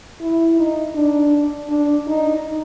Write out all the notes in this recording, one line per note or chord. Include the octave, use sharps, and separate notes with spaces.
E4
D#4
D4
D4
D#4